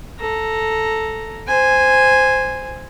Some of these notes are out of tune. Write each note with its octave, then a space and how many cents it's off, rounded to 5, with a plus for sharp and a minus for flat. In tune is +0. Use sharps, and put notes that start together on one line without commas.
A4 +0 A#5 +0
C5 -10 G#5 -5